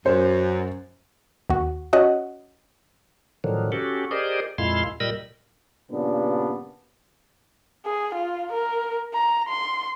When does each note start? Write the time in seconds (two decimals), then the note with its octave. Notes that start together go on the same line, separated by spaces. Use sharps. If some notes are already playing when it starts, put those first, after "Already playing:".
0.06 F#2 C5
1.50 D#2 F#4
1.93 C#4 F#4 D#5 F#5
3.44 A2 D3 D#3 F3 F#3
3.72 C#4 F#4 G4 A4
4.11 G4 G#4 A#4 C5 D5 D#5
4.58 F2 A#2 G#3 E4 F5 C6
5.00 A#2 G3 A#4 D#5 B5 E6
5.91 G2 A#2 C#3 B3 D4
7.86 G#4
8.15 F4
8.52 A#4
9.14 A#5
9.48 C6